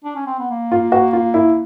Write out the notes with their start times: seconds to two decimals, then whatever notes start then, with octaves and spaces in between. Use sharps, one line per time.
0.04 D4
0.16 C#4
0.26 C4
0.39 B3
0.50 A#3
0.72 F4
0.92 F#4
1.13 F4
1.34 E4